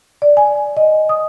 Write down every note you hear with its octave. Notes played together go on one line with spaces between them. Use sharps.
D5
G#5
D#5
D#6